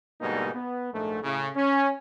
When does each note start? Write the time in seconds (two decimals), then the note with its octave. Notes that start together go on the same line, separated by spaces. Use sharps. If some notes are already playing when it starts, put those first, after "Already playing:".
0.20 G#2 B2 D3 G3 A#3 D#4
0.54 B3
0.92 A#1 G#2 A3
1.22 A2 C#3
1.55 C#4